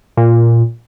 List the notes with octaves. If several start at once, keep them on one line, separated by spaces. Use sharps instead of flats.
A#2